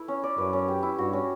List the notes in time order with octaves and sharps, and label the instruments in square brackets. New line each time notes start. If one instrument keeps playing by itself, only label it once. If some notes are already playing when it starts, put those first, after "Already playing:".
Already playing: [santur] A3 E4 B4
C#4
D5
[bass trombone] F#2 [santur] B4
[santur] C#4
G4
E4
[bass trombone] G2 [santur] F#4
[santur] C#4